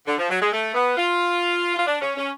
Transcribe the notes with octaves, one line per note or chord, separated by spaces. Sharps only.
D3
F3
F#3
G#3
A3
B3
F4
F4
D4
C#4
C#4